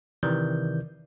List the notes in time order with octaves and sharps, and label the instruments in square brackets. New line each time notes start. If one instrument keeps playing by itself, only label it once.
[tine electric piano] C3 D#3 E3 D5 G6